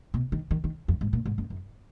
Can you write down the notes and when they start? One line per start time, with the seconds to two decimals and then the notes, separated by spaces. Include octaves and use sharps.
0.14 B2
0.32 D#3
0.51 D#3
0.64 D#3
0.88 F2
1.01 G#2
1.13 A#2
1.26 G#2
1.38 F#2
1.50 F#2